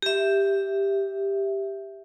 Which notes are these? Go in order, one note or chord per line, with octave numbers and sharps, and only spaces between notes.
G4 E5